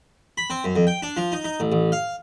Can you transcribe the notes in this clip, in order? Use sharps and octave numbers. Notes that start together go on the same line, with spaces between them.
B5
C4
F#2
F2
G5
D4
F3
D#4
D#4
A1
A1
F5